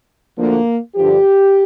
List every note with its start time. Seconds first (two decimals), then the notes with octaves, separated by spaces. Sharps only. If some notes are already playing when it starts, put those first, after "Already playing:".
0.37 D2 D3 F3 A#3
0.95 G2 D3 F3 G4